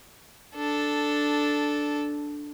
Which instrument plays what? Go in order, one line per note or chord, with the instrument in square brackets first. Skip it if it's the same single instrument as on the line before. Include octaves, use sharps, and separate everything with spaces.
[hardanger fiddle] D4 A4